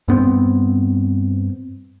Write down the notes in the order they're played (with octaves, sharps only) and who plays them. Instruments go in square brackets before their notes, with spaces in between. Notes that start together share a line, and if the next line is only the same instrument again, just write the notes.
[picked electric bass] G2 B3 C4